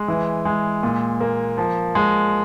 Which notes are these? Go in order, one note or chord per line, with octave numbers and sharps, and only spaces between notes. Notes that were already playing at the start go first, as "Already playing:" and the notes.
Already playing: G#3
E3
G#3
A#2
A#3
F3
G#3